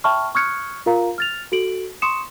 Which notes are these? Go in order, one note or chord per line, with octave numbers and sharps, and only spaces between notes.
E5 G5 A5 B5 C#6 F6
C#6 D#6 F6 F#6 G#6 C#7
F4 A#4 F5 A#5
F6 A6 F7
F#4 A4 D7 F#7
C6 C#6 D#6 C#7 E7